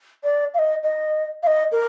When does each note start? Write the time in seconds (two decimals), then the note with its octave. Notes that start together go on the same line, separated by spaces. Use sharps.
0.24 D5
0.54 F5
0.58 D#5
0.83 D#5
1.42 F5
1.46 D#5
1.71 A#4